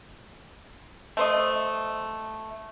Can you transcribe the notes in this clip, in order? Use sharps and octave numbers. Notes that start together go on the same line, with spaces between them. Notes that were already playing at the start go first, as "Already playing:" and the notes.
A3 C5 D#5